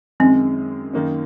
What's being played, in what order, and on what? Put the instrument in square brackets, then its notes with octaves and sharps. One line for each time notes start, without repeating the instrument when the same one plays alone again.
[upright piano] F#2 D#3 G#3 [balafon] C4
[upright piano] F#2 D#3 A#3 D#4